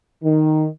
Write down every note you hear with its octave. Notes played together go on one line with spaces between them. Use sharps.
D#3